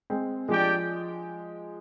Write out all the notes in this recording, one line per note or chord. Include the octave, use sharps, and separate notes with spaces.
G#3 C4
F3 G#3 D4 G4 D5 G5